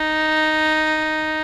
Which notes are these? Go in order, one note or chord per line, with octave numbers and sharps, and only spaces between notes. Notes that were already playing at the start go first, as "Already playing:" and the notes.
Already playing: D#4